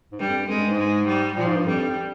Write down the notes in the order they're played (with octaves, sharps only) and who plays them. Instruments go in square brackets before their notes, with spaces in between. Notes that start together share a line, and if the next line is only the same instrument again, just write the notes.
[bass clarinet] G#2
[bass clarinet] G2 [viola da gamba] G3
[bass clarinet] F2
G2
[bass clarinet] F2 [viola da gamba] G#3
[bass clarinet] G2
G#2
[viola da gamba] G#3
G3
[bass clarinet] A#2 [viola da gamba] F3
[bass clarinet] G#2
G2
[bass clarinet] F2 [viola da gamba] G3